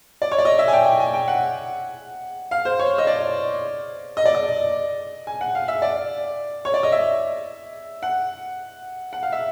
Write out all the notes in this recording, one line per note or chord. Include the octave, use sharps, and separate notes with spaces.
D5
C#5
D5
D#5
E5
G#5
G5
G5
G#5
G5
F#5
F5
C5
C#5
D#5
D5
D#5
D5
D#5
G#5
F#5
F5
E5
D5
C#5
D5
D#5
E5
F#5
F#5
F5
E5